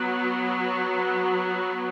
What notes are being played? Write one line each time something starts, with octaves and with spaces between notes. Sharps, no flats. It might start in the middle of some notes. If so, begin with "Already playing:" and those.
Already playing: F#3 B3